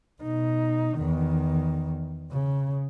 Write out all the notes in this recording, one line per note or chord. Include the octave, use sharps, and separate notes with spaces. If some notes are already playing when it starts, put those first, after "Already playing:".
B2 D#4
E2 D#3
C#3